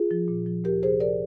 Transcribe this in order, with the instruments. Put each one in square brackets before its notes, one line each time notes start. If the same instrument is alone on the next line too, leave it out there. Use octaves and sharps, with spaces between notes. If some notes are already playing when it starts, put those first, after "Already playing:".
Already playing: [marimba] F4 G#4
F3
A#2
F3
D2 G4 A#4
C3 G#4 C5
A#4 D5